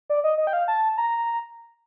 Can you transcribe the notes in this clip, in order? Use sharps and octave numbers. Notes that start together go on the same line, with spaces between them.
D5
D#5
D#5
G5
F5
A5
A#5